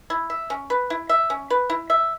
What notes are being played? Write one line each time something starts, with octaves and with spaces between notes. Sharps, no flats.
E4
E5
C#4
B4
E4
E5
C#4
B4
E4
E5